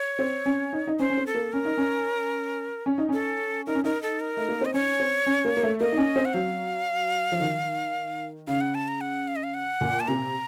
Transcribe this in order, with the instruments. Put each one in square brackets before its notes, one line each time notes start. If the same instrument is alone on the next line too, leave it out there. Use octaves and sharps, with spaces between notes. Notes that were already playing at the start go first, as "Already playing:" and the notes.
Already playing: [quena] C#5
[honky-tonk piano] C4
C#4
D#4
D#4
[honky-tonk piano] C#4 [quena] C5
[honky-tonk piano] C#4
C4
[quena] A4
[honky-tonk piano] A#3
[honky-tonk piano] C#4 [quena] A#4
[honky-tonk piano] D#4
C#4
C#4
D#4
[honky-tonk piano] C#4 [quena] A4
[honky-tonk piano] D#4 [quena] A#4
[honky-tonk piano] C#4
[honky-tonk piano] D#4 [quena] A#4
[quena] A4
A#4
[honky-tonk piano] A3
A#3
[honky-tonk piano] C4 [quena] D#5
[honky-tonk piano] C#4 [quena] C#5
[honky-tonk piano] C4
C#4
A#3
A#3
A3
[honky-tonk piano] A#3 [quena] D#5
[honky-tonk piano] D#4
C#4
C4
[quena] F#5
[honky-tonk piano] F#3 [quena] F5
[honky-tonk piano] F3
D#3
[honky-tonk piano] C#3 [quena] F5
[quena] F#5
A5
A#5
F#5
F5
D#5
F5
F#5
[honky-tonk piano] A#2
[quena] A5
[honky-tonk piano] C3 [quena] A#5